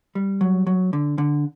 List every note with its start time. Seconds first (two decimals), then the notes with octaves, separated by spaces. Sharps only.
0.15 G3
0.41 F#3
0.67 F#3
0.93 D3
1.18 D3